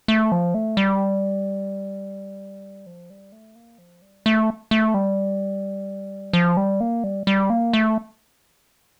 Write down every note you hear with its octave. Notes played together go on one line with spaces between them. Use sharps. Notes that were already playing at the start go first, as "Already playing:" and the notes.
A3
F3
A3
G3
F3
G3
A3
A#3
F3
G3
A3
A3
G3
F3
G3
A#3
G3
G3
A#3
A3